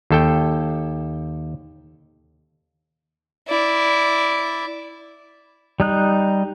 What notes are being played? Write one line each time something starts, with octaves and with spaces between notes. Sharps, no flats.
D#2 A4 G5
E4 D5
G3 D#4 F#6